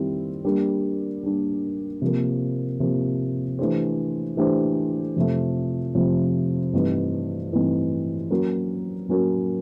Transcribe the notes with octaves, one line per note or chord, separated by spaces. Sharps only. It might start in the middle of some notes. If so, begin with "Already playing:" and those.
Already playing: D#3 G3 C4 E4
G3 A#3 D4
G3 A#3 D4
C3 F3 A#3
C3 F3 A#3
E3 A3 D4 G4 C5
E3 A3 D4 G4 C5
F2 C3 F3 A3
F2 C3 F3 A3
G2 E3 A3 C4 D#4
G2 E3 A3 C4 D#4
F#3 A#3 C#4 F#4 A#4
F#3 A#3 C#4 F#4 A#4